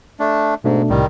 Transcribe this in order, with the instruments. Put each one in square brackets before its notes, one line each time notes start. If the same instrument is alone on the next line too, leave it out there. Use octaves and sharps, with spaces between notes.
[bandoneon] A3 D4
[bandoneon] G#2 [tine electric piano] B2 A3 D4
[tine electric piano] C2 A2 C3 [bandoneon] D#3 G3